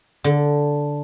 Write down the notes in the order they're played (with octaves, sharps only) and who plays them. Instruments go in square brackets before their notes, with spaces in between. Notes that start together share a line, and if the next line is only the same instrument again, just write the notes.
[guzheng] D3